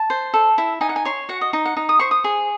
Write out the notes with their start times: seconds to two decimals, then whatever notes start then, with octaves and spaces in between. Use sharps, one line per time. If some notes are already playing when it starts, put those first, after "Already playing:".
Already playing: A5
0.10 C5
0.34 A4
0.58 E4
0.81 D#4 G#5
0.89 F#5
0.96 G#5
1.05 C#5 C6
1.29 F#4 F#5
1.41 D#5
1.53 D#4
1.66 F#5
1.77 D#4
1.89 D#6
1.99 C5 C#6
2.11 D#6
2.24 G#4